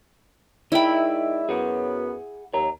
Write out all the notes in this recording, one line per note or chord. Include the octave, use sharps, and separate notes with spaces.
G#3 D#4 E4 A#4 D5 E5 G5 B5
F#2 F#3 B3 G#4 F#5
D#2 C#5 A#5